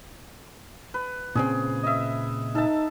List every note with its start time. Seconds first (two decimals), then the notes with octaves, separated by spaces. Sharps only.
0.94 B4
1.35 A#2 C#3 C4 G#4
1.83 D#5 E5
2.55 D#4 A4 E5 A5